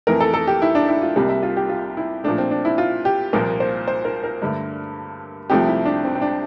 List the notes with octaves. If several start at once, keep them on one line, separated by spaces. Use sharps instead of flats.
F2 E3 A3 A#4
A4
A4
G4
E4
D4
E4
F4
C2 C3 G3 A#3
E5
F4
G4
F4
E4
A#2 F3 A3 D4
C4
D4
E4
F4
G4
C2 A#2 F3 A#3 A#4
C5
C5
A#4
A#4
G2 D3 A3
C2 C3 F3 A3 G4
E4
D4
C4
C4
D4